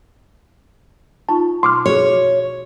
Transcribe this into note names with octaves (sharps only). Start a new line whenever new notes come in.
D#4 F4 A5 C#6
B2 C6 D6 F6
F#4 G#4 C#5